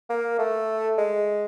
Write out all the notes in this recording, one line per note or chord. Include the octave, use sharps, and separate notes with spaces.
A#3
A3
G#3